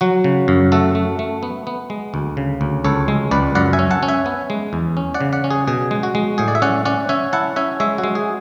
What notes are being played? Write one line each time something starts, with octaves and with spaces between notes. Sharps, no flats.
F#3 F#4
C#3
F#2
A3 F#4 A4
A3
A3
B3
B3
G#3
D2
C#3
D2
C#2 A4 C#5
G#3
C#2 B4 D5
F#2 D5 F#5
E5 G#5
C#4
F#5 A5
C#4
E5 G#5
B3
G#3
E2
C#4
D5 F#5
C#3
D5 F#5
C#4
G#4
B2 G#4
G#3
F#4
G#3
A2 G#4
D5
E5
C#4 D5 F#5
C#4 D5 F#5
C#4 E5 G#5
E4 F#5 A5
C#4 E5 G#5
G#3 C#5 E5
F#4
G#3
G#4